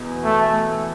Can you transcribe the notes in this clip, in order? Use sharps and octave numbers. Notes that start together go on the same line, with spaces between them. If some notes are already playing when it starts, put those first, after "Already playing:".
Already playing: E2 B2 B3
A3